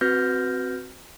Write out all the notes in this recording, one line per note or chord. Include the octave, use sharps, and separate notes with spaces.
C4 F#4 B4 F6 G6 A#6